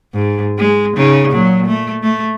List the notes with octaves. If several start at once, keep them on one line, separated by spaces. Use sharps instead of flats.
G#2
G#3
C#3 D#4
A#2 F#3
A3
A3